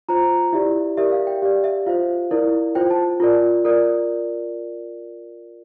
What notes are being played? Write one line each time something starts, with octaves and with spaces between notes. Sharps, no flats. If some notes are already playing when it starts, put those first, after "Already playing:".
F4 C5 A#5
E4 G4 D5 E5
G4 A#4 D5 E5
F5
G5
G4 D5 F5
E5
F4 C5 F5
E4 A#4 D5
F4 C5 G5
A5
F4 A#4 D5
F4 A#4 D5